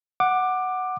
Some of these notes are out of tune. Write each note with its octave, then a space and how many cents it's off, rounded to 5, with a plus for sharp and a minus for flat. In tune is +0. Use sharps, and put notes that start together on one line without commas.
F#5 +0 D6 +15